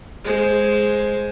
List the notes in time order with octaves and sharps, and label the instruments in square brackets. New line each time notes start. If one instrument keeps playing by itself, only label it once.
[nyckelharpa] G#3 C5